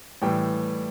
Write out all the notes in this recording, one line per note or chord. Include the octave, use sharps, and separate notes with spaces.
A2 E3 G3 G5